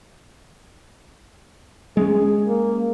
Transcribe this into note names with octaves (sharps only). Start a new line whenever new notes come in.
G#3 B3 C#4 G#4
A#3